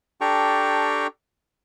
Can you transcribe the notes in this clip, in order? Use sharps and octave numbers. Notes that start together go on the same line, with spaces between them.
D4 G4 A4 G5 A#5 C#6